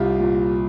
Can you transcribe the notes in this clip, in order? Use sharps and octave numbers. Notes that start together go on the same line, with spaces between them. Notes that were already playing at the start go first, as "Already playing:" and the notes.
Already playing: C2 F4 G4
A#2